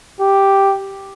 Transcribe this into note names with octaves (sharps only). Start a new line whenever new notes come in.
G4